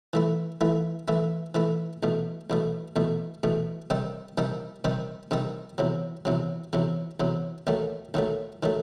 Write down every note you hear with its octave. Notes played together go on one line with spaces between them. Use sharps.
E3 A3 E4
E3 A3 E4
E3 A3 E4
E3 A3 E4
E2 B2 A3
E2 B2 A3
E2 B2 A3
E2 B2 A3
C3 D#3 G3 D#4
C3 D#3 G3 D#4
C3 D#3 G3 D#4
C3 D#3 G3 D#4
E2 C3 F#3
E2 C3 F#3
E2 C3 F#3
E2 C3 F#3
D#2 D#3 F#3 A3
D#2 D#3 F#3 A3
D#3 F#3 A3